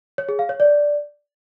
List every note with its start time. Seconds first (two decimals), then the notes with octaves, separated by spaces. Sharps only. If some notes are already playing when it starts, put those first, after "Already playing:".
0.18 C#5
0.29 G#4
0.39 F5
0.49 C#5
0.60 D5